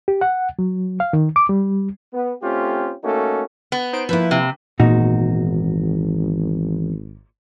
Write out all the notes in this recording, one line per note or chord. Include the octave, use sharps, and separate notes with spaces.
G4
F#5
F#3
F5
D#3
D6
G3
B3
A3 C4 C#4 F4 G4
A3 A#3 C#4 D#4 F#4 A4
B3
D#4 C5 D7
F3 A#3 E4 B4 E5
C3
G#1 E2 A#2 D#4 F#4